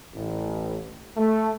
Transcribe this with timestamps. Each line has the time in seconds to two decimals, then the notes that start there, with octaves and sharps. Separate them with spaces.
0.14 A1
1.17 A3